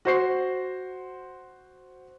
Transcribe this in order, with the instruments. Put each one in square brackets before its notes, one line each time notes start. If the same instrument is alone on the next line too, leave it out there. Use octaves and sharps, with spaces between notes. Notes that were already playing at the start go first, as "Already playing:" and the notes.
[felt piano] F#4 C5 C7